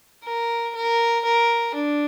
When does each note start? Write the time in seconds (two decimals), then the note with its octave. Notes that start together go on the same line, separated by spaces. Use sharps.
0.24 A#4
0.74 A#4
1.24 A#4
1.74 D4